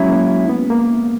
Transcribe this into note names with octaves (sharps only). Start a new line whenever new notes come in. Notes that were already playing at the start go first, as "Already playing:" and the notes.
Already playing: F#3 G#3 C#4 E4
A#3
B3
A#3